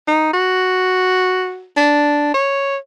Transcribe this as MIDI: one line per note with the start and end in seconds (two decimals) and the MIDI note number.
0.08 0.31 63
0.33 1.66 66
1.77 2.33 62
2.34 2.76 73